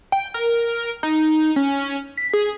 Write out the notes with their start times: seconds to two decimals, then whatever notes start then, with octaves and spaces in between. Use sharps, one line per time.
0.12 G5
0.34 A#4
1.03 D#4
1.56 C#4
2.17 B6
2.34 G#4